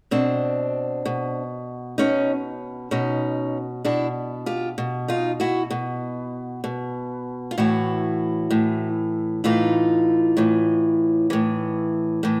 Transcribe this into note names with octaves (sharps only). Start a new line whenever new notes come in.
B2 C4 D4
B2
B2 C#4 D#4
B2 C#4 D#4
B2 D4 E4
F4 G4
B2
D#4 F4
E4 F#4
B2
B2
F4
A2 E3 E4 F#4
A2 E3
A2 E3 D#4 F4
A2 E3
A2 E3
A2 E3